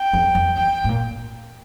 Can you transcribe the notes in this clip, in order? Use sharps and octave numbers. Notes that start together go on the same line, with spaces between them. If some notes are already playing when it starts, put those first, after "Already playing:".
Already playing: G5
F2
F2
E2 G5
A2
A#2